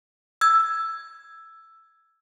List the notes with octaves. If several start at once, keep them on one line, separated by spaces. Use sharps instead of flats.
E6 G#6